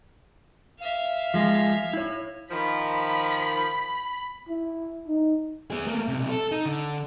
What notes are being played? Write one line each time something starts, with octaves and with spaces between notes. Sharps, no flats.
E5 F5
F3 G#3
E4 C#5
D#3 F3 B5
E4
D#4
B3 G#4
A3 A#3
B1 C3
A4
D#4
D3